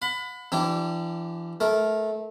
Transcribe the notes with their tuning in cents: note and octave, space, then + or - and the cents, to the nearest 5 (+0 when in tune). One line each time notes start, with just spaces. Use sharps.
F#5 -40 B5 +20
E3 +40 D4 +20 G4 -20
A3 -20 A#4 +0